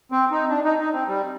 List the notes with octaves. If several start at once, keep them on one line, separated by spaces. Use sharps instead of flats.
C4
D#4
D4
D#4
D#4
C4
G3